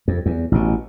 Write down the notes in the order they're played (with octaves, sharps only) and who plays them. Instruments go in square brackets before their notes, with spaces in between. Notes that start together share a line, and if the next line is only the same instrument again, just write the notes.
[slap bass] F2
E2
A1 B2